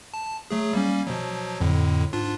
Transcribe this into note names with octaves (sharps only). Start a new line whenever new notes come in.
A5
F#3 A3 G#4
G3 A#3 C#4
B2 F3 F#3
F2 A2 D3
G#2 D4 F4